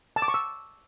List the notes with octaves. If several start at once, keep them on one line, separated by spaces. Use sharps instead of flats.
A5
D6
C#6
E6